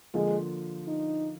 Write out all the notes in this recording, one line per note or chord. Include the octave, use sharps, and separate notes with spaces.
D3 F3 G#3 A#3 F4
D#4